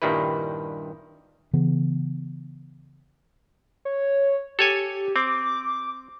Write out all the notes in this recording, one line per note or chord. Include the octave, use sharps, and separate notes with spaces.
G2 A#2 D#3 G3 E4 B4
C#3 E3 B3
C#5
G4 A4 C#5 G#5
C4 D6